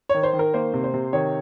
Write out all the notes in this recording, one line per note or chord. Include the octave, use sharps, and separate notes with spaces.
D#3 C#5
C5
D#3
A#4
A#3 C5
C3
C5
C3
D#3 C#5